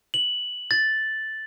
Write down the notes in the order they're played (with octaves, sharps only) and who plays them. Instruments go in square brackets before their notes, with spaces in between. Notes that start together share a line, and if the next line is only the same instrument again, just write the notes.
[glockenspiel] F#7
A6